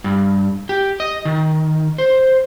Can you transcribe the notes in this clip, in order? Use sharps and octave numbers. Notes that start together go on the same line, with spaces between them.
G2
G4
D#5
D#3
C5